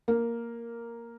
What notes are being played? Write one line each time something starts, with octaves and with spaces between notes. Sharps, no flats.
A#3